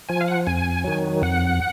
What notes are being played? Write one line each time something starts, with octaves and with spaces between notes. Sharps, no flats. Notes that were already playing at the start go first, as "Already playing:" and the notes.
F3 G#5
F5
F#5
F2 G#5
D#3 F#3
F2 F#5